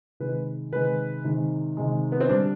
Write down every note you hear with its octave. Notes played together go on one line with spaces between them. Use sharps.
C3 D#3 G#3 B4
C3 D#3 G#3 B4
C3 D#3 G#3
C3 D#3 G#3
B3
C4
D3 G3 D4